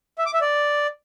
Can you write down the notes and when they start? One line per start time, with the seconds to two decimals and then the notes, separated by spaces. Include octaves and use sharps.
0.18 E5
0.26 D6
0.33 E5
0.41 D5